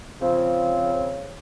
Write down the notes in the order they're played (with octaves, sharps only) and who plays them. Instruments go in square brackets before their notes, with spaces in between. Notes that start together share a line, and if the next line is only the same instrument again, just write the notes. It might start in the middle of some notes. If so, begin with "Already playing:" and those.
[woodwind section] C#3 F3 C4